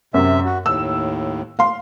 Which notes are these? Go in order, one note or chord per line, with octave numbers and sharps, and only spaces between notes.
F#2 C3 E5
F#4
D#2 A2 E6
F5 C6